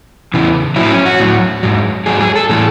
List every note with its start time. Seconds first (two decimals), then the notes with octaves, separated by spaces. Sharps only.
0.34 E2 C#3 E3
0.76 A2 F#3 E4
0.90 C#4
1.06 F#4
1.20 A2 F#3
1.63 G#2 F#3
2.06 G#2 F#3 G#4
2.21 G#4
2.35 A4
2.49 A2 E3 G#4